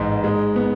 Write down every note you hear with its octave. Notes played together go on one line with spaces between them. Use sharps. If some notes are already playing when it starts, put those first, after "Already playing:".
Already playing: A1 G#2
G#3
B3